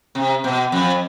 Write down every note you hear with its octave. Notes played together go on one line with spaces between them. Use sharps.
C3
B2
F2